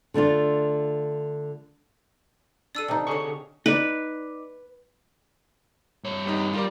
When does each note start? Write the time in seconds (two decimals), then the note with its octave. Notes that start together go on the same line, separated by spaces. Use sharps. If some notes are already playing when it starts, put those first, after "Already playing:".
0.14 D3 A3 D4 F4
2.75 D4 A4 D5 E6 D#7
2.88 C3 D#4
3.07 D3 G4 G#4 C#5 C#6
3.66 D#4 B4 D5
6.04 G2 C#5
6.26 G3 B3 D#4
6.53 G3 F4 A#4 D5